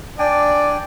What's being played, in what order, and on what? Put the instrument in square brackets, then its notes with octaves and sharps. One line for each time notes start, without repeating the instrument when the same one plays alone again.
[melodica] D4 G5 G#5 [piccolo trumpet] D5